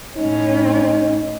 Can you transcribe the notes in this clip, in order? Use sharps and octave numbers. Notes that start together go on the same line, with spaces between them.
A2 C#4 D#4